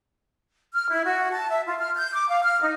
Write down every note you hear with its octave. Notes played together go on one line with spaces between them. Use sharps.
F6
E4
F#4
A5
E5
F4
F6
G6
D6
F5
F6
D#4